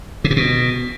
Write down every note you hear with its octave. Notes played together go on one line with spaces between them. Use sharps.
C3
A#2
B2